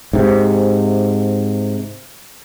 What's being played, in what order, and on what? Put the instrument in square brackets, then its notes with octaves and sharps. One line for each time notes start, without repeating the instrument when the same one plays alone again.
[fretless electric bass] G#2 C3